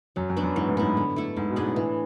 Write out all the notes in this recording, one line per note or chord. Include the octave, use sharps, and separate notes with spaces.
F#2 F#3
F#2
B3 D4 F#4
F#2
G#2 E3
A2
G#2 B3 E4
D3
A3 E4 A4
G#2 G#3
B2
G#2 D4 G#4 B4
A2
E3